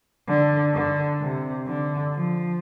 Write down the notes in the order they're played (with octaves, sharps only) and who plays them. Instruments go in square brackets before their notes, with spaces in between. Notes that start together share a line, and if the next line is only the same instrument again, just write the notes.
[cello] D3
D3
C3
D3
F3